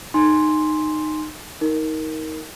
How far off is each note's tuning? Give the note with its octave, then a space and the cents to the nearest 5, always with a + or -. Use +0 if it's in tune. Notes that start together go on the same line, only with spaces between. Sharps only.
D#4 -15 G#5 +0 C6 +0
D#4 +25 A#4 +0